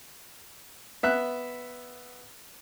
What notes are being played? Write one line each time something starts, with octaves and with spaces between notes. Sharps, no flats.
B3 E5 F#6